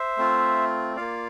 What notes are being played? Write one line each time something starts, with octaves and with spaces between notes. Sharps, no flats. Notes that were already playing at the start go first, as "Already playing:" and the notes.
Already playing: C5 E5
A3 C4 F4
A#3 F4 D5 F5